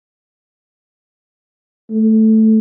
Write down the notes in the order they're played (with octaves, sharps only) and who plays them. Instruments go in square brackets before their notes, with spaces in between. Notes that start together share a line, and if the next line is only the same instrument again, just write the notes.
[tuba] A3